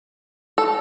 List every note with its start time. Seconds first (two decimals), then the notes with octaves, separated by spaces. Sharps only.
0.58 A4